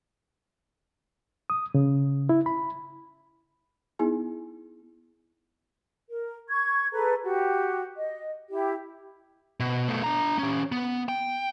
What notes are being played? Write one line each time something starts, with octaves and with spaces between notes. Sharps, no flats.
D#6
C#3
E4
B5
B3 D#4 E4 G#4 G#5
A#4
C#6 G#6
G#4 A4 B4 A#5
F#4 G4
D#5
E4 G4
B2
B2 A3
D4 A#5
C#4 G4
B3
G5